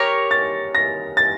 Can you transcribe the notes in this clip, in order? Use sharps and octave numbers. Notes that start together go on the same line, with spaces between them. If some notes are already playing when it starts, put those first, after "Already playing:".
Already playing: G4 A#4 C#5 A#6
A6
A#6
A6